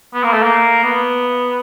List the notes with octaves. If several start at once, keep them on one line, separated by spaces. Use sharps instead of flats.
B3
A#3
A3
A#3
B3